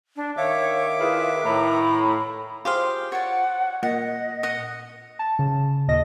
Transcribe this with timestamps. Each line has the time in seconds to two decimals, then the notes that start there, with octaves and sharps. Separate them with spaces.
0.16 D4
0.37 D#3 C#5 E5 F5 D6
1.00 E4 F4 G#4 B4
1.44 A2 A#5 B5
2.65 F4 G4 G#4 C5 F5
3.12 C#5 D5 F#5
3.83 A#2 D#5 F#5
4.43 D#5 F#5
5.19 A5
5.39 C#3
5.88 D#2 A#2 D#5 A#6